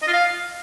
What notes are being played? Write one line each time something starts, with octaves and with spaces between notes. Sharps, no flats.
D#5
F4
F5